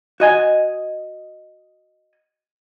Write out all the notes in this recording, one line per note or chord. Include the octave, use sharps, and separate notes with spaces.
F#4 D#5 G#5